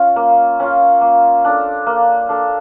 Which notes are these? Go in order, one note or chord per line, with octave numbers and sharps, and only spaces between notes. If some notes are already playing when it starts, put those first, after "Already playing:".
Already playing: C#4 F4
A#3
C#4 F4
A#3
D4 A4
A#3
D4 A4